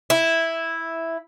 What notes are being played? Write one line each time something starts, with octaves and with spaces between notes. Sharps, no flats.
E4